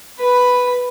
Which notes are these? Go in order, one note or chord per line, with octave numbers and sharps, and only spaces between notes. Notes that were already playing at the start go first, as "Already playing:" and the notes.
B4 B5